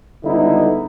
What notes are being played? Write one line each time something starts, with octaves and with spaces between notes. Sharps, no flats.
C#2 D3 G3 B3 D#4 E4